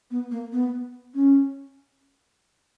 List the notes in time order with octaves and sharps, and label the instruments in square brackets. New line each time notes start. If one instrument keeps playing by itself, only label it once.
[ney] B3
A#3
B3
C#4